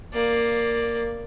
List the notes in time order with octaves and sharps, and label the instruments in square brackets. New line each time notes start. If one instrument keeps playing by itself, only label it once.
[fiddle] A#3 D5